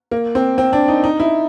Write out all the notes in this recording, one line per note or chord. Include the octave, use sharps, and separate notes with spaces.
A#3
C4
C4
D4
D#4
D#4
E4